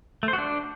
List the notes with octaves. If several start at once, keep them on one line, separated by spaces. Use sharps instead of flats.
A3
C5
F#4
D4